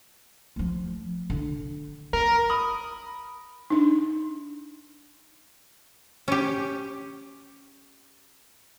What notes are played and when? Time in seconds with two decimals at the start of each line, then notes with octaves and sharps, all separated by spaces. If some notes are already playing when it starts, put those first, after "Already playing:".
0.56 F3 A3
1.30 D3 D4
2.13 B3 A#4
2.50 B5 D#6
3.70 D4 D#4
6.28 C#4 G4